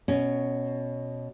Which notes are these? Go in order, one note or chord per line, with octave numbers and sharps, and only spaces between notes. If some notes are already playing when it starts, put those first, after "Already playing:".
B2 C#4